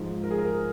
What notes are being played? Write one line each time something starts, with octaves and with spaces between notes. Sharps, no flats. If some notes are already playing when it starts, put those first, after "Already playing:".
Already playing: G#2 F3 G#3
A#4
G#4
A#4